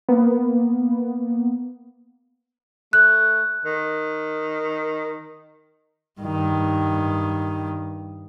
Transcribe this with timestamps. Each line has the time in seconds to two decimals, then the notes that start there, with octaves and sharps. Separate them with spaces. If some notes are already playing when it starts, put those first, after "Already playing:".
0.09 A#3 B3
2.93 A3 F#6
3.65 D#3
6.21 G2 D#3